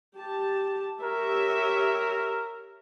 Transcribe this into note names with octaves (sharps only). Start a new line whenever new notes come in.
G4 A5
G4 A#4 C#5 E5